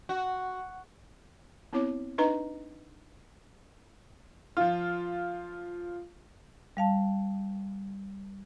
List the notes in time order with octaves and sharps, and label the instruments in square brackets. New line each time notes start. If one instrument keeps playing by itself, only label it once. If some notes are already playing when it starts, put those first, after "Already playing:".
[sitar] F#4
[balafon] B3 C4 E4 C#5 D6
D4 D#4 B4 D#5 A#5
[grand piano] F3 F4
[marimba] G3 F5 A5